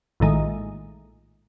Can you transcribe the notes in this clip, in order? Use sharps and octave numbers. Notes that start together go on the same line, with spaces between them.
A#1 A2 D#3 G#3